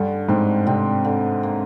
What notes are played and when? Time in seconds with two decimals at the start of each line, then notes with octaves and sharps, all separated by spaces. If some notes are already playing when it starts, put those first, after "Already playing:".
Already playing: G2 D3
0.29 G#2 C4
0.67 C3 C4
1.05 D3
1.43 A#3